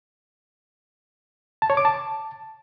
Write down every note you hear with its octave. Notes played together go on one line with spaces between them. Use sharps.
A5
C#5
D6
A5